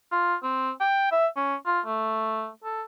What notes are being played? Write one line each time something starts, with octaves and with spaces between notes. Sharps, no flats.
F4
C4
G5
E5
C#4
F4
A3
A4